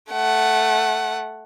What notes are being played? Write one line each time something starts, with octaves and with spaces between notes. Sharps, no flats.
A3 F#5